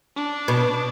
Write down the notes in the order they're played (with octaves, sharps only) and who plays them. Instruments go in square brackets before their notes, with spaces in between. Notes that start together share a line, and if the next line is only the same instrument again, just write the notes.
[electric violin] D4
[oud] B2